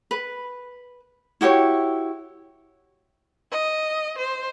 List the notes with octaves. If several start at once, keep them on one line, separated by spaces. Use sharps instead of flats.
B4
E4 F#4 G4 C#5
D#5
C5